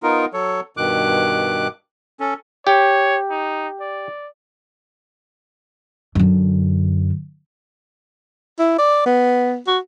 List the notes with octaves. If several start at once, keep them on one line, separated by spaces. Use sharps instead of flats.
B3 D#4 F4 A#4
F#3 A4 C#5
G2 B2 D#3 D6 F#6
C#4 A4
G4 C#5
D#4
D5
F#2 D3
E4
D5
B3
F#4